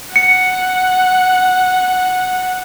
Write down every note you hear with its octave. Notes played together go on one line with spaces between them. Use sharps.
F#5 C#7